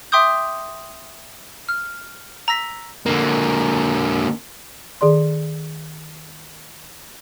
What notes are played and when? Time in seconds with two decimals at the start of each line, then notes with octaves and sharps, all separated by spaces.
0.12 E5 G5 C6 D6 D#6 G6
1.69 F6
2.48 A#5 E6 A#6 B6
3.06 D3 A#3
5.01 D#3 G#4 D5 C6